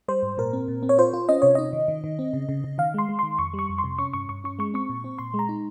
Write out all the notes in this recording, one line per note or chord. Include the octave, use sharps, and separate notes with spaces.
G3 C5
G#2
A#2 A#4
C4
A#2
C4
C#5
F4 C5
F4
C#4 D#5
C3 C#5
D#4 D#5
D#3
D#3
D#3
C4
C#3
C#3
C#3
D#3 F5
G#3 C6
G#3
D#3 C6
F2 C#6
G3
C#6
F2
C6
C3
C#4 C#6
G2 C#6
G2 C#6
C#4 C#6
G#3 C#6
C4 C#6
A#2
C4
A#2 C6
G#3
A#5
D#4